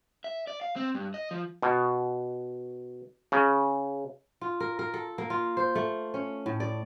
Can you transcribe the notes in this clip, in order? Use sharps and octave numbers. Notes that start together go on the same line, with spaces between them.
E5
D5
F5
C4
G2
D#5
F3
B2
C#3
F4
A#4
A#4
A4
A#3
F4
C5
A3
C#4
A2
D5